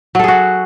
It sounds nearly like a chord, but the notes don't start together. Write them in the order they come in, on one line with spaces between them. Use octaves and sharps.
F#3 A4 G#4 F#4